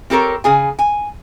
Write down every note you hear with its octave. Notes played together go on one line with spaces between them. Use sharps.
C4 G4 A4 A#4 C#5
C#3 G#4 G#5
G#5